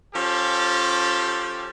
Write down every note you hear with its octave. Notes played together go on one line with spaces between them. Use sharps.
F3 C#4 G4 A4